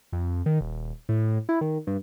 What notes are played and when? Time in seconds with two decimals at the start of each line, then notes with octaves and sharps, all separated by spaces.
0.12 F2
0.46 D#3
0.61 D#1
1.09 A2
1.49 E4
1.61 D#3
1.87 G2